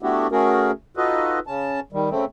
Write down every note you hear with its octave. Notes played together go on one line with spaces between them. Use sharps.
A3 B3 D4 E4 F#4 G4
A3 C#4 F#4 G#4 A#4
D#4 F4 F#4 A4 B4 D#5
C#3 C#4 A5
D#3 G3
C#3 A3 C4